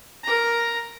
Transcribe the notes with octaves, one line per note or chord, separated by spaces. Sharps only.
A#4 A#5